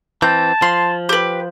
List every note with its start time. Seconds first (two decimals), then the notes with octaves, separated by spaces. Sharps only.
0.22 E3 C4 A5 G6
0.62 F3 C6
1.09 G4 B4